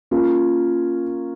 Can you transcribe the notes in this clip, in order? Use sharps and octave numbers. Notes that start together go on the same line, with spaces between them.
A#3 C#4 F4